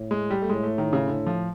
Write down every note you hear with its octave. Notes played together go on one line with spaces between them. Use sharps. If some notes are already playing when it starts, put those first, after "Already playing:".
Already playing: A2
G#3
G3
A3
A2 G#3
A3
D#3
C#3
D3
F3